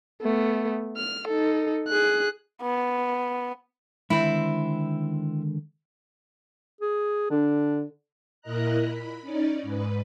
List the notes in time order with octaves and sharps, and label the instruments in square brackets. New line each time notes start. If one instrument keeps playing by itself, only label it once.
[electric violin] A3 B3
F6
D#4 A4
G#4 F#6
[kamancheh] B3
[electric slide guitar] D3 D#3 G#3 [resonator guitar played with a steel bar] C4 E4
[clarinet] G#4
[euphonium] D3 [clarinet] D4
[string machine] A#2 E4 A#4 D#5 A#5 F#6
B5
C#4 D#4 D5
G#2 B4